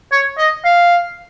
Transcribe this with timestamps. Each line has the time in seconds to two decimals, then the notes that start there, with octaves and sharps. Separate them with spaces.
0.12 C#5
0.38 D#5
0.64 F5